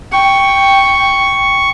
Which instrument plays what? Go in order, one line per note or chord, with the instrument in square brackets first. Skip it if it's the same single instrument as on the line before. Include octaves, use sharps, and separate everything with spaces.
[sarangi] G5 [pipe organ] C#6